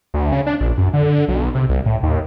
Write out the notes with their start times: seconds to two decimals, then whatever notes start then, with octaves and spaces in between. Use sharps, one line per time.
0.14 D2
0.32 C#3
0.46 D4
0.61 A#1
0.78 F#2
0.93 D3
1.28 B1
1.55 C3
1.69 C2
1.86 A2
2.03 D#2